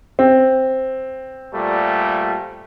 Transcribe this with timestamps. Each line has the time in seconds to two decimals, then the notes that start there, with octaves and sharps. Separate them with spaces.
0.19 C4
1.54 A#2 G3 A3